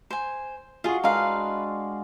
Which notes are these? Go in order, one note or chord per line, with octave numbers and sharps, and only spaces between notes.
C5 G#5
F4 F#4 G#4 F5
G#3 D4 A#4 B4 F5